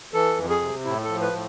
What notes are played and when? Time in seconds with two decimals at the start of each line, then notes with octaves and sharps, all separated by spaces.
0.14 E3 A4
0.37 F2
0.50 G#4
0.62 C3
0.85 A2 E4
1.04 A4
1.09 F3
1.21 B4
1.33 A2